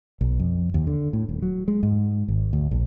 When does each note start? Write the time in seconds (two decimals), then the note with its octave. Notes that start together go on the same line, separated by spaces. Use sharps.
0.21 B1
0.39 F2
0.74 D#2
0.87 D3
1.13 A2
1.29 D#1
1.42 F#3
1.68 G#3
1.83 G#2
2.28 G#1
2.53 D2
2.71 A#1